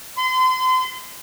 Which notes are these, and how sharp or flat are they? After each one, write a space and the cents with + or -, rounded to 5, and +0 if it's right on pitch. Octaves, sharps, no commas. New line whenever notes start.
C6 -35